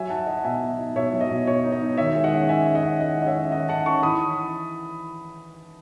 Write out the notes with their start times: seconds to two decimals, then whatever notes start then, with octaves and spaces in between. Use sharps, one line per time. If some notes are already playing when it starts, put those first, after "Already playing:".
Already playing: F#3 E5 G#5
0.10 D#4 F#5 A5
0.26 D#4 D#5 F#5
0.44 B2 E5 G#5
0.61 D#4
0.79 D#4
0.95 B2 C#5 E5
1.12 F#3
1.21 D#5
1.30 B2
1.47 B2 C#5
1.64 D#4
1.72 D#5
1.81 D#4
1.97 D#3 C#5 E5
2.15 G#3
2.24 D#5 F#5
2.33 C#4
2.49 C#4 E5 G#5
2.66 C#4
2.75 D#5 F#5
2.83 C#4
3.00 G#3 D#5 F#5
3.18 C#4 D#5
3.26 C#5 E5
3.35 C#4
3.51 D#3 D#5 F#5
3.68 D#3 F#5 A5
3.86 C#4 A5 C#6
4.03 E3 B5 D#6